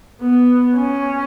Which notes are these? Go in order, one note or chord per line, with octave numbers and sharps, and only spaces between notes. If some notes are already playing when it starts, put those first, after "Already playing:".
B3
C#4